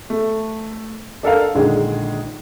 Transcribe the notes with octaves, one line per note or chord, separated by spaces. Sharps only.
A3
D4 A4 A#4 F5
A#1 D3 D#3 G#3 G#4